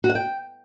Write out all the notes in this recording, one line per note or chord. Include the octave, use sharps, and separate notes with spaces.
F#4
F#5
G5